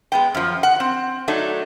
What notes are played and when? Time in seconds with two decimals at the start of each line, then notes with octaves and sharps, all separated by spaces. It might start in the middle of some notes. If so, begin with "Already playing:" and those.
0.12 G#3 B3 G5
0.34 F#2 F3
0.63 F#5
0.80 C4
1.28 F#3 A3 D4 D#4